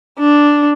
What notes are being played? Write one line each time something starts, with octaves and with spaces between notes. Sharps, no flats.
D4